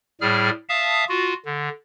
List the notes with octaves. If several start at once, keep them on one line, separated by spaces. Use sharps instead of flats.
A2 G3 G#4 F6
E5 F5 A5 D#6
F4 F#4
D3